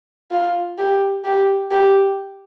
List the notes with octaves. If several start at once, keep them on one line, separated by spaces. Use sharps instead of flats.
F4
G4
G4
G4